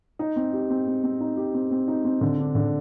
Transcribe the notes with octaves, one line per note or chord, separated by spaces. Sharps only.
D#4
C4
G4
C4
C4
C4
D#4
G4
C4
C4
D#4
C4
D3
D4
D3